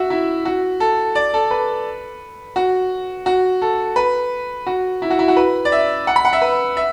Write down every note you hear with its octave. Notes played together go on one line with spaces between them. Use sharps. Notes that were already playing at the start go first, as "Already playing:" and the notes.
Already playing: F#4 E5
E4
F#4
A4
D5
A4
B4
F#4
F#4
A4
B4
F#4
E4
F#4
E4
F#4
B4
D5
E5
F#5
B5
F#5
E5
B4
E5